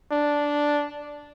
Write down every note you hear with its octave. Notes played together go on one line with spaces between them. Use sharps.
D4